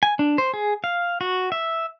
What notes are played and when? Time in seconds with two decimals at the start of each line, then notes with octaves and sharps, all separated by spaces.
0.03 G#5
0.19 D4
0.38 C5
0.54 G#4
0.84 F5
1.21 F#4
1.52 E5